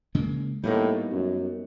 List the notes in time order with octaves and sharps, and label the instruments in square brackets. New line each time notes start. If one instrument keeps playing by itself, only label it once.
[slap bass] C#3 G#3 A#3
[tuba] A2 [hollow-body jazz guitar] G3 A#3 D#4 [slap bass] B3
[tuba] F#2